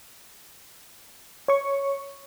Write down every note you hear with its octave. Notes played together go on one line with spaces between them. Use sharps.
C#5 C#6